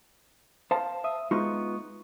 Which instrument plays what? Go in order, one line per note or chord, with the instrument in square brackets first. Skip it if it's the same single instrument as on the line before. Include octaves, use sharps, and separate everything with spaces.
[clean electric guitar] C5 F5 A5
[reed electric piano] E5 D#6
[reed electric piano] G#3 C#6 [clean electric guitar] B3 D#4 F4